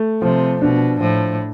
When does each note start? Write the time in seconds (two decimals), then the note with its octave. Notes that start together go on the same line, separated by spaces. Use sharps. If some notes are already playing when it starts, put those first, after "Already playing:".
Already playing: A3
0.22 C3 F3
0.61 B2 D4
1.00 A2 F3